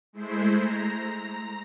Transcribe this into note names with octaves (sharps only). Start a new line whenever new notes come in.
G#3 A3 E4 C5
A#5